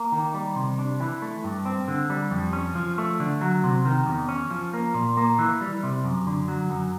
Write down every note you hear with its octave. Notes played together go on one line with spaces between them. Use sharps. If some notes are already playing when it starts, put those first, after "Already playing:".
Already playing: A#3
D#3
G3
C3
D4
E3
A3
G2
C4
D3
G3
F2
C#4
F3
A3
D3
F#3
C3
D#3
E2
C#4
F3
A#3
A#2
A#3
E3
G3
C3
F#2
D3
F#3
F#2